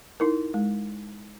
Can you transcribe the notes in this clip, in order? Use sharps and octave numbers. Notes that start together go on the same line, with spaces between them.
D#4 E4 A#4
G#3